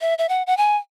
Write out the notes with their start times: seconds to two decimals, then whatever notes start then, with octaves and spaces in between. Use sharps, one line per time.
0.01 E5
0.18 E5
0.29 F#5
0.47 F#5
0.57 G#5